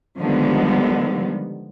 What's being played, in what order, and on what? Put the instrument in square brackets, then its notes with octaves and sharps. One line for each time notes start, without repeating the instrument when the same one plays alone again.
[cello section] D3 D#3 F3 G3 G#3 B3